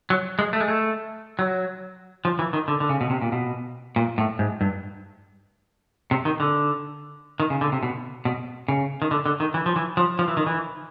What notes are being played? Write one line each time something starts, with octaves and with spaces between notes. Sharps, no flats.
F#3
G#3
A3
G#3
A3
F#3
F3
E3
D#3
D3
D3
C#3
B2
C3
A#2
B2
A#2
A2
G#2
G2
C3
D#3
D3
D#3
C#3
D3
C#3
C3
B2
B2
C#3
D#3
D3
D3
D#3
E3
F3
E3
F3
F3
E3
D#3
E3